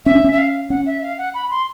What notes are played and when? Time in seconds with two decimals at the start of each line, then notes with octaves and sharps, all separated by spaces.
0.05 C#4 E5
0.15 D4
0.24 C#4
0.32 E5
0.38 F5
0.70 C#4 F#5
0.86 E5
1.02 F5
1.18 F#5
1.34 B5
1.50 C6